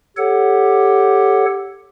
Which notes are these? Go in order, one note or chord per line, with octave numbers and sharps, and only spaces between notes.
G4 A4 C#5 F#5